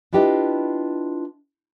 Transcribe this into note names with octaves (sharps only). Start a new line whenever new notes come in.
D4 E4 F4 G4 B4 D#5